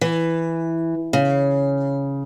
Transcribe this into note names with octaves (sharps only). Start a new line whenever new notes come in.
E3
C#3